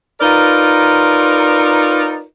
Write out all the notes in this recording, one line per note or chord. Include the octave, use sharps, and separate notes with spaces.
D#4 F4 A#4 B4 D5